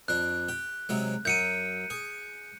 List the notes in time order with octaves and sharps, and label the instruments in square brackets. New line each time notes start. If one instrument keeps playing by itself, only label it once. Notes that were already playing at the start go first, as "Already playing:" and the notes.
[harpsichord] F2 D4 [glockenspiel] F#6
[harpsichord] G4
C3 F#3 G#3
[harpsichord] F#2 F#3 [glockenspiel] G6 C#7 D#7
[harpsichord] G#4